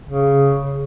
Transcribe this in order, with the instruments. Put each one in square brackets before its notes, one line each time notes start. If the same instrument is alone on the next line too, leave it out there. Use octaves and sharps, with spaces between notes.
[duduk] C#3